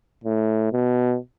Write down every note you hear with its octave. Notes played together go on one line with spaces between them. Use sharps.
A2
B2